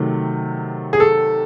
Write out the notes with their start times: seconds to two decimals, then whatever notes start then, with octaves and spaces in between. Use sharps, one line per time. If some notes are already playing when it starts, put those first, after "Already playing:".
Already playing: C3 D#3 F#3 A3
0.93 G#4
1.00 A4